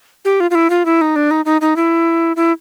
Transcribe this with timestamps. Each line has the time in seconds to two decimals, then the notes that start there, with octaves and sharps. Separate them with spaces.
0.25 G4
0.40 F4
0.51 F4
0.55 E4
0.70 F4
0.85 E4
1.01 D#4
1.16 D4
1.31 D#4
1.45 D#4
1.61 D#4
1.76 E4
2.36 E4